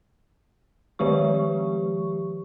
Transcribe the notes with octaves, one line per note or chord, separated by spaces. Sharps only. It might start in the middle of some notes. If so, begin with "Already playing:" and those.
D#3 F3 G#3 G4 C#6